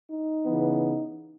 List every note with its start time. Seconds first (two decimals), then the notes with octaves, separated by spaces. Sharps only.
0.09 D#4
0.45 C#3 E3 B3